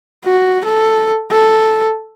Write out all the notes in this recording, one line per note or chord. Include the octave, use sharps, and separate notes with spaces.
F#4
A4
A4